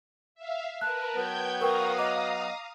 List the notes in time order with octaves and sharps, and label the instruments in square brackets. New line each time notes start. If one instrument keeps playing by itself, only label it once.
[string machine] E5 F5
[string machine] A#4 B4 [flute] A5 [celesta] F#6
[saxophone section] F#3 B3 [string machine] G5 G6 G#6
[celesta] A#4 B4 G5 [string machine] F5 A#5 D#6 [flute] C#6
[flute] D#5 [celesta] D6